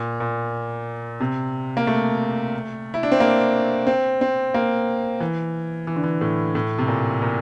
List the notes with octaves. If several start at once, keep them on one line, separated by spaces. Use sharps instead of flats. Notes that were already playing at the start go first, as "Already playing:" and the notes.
Already playing: A#2
A#2
C3
A#3
A3
E4
D4
C4
A#3
C4
C4
A#3
E3
E3
D3
E3
A2
A2
C3
A#2
A#2